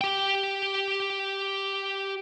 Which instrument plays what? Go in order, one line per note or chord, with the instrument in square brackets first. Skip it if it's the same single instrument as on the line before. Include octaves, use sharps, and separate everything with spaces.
[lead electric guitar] G4 G5